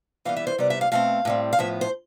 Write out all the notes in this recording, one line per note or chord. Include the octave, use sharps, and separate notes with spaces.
E3 G3 B3 F5
E5
C5
C3 G3 B3 D5
E5
F5
B2 A3 C4 F5
A2 G3 C4
F5
A2 F3 B3 E5
C5